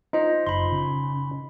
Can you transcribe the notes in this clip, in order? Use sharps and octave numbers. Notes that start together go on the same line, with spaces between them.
D#4 F4 C5 D#5
F#1 B5 C6
C#3